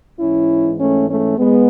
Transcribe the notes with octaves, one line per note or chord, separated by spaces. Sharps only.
G#2 E3 C#4 E4
A3 C#4
A3 C#4
G#2 G#3 B3